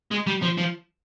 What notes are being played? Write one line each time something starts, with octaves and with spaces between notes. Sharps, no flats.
G#3
G3
F3
F3